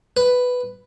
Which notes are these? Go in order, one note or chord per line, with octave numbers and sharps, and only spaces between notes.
B4